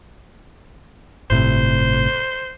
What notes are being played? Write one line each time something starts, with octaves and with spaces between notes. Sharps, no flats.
G1 A2 C3 C5